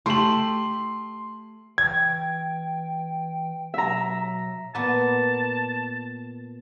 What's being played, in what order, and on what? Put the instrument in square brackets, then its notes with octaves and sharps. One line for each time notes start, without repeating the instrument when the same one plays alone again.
[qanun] A3 G4 [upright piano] C6 F#7
[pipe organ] E3 G5 [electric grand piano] G#6
[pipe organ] B2 F#3 [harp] E5 A#5
[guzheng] A#2 B3 [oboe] A5